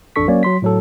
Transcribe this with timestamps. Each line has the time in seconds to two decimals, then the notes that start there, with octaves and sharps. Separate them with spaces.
0.16 A1 F2 D4 A4 C#6 B6
0.28 F#3 A#3 C#4 C#5 D5
0.43 F#3 C6 B6
0.62 A2 F#3 A4